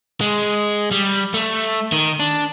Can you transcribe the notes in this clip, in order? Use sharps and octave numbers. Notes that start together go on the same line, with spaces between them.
G#3
G3
A3
D#3
D4